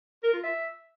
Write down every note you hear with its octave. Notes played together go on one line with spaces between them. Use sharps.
A#4
F4
E5